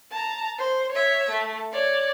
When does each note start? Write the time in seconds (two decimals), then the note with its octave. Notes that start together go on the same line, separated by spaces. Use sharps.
0.11 A5 A#5
0.58 C5
0.92 C#5 E5
1.30 A3
1.72 C#5 D5